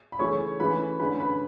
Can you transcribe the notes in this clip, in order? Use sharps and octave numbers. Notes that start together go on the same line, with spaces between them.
B5
C#3 E3 A3 C#4 C#5 C#6
E3 A3 C#4 B4 B5
D3 A3 C#4 B4 B5
B4 B5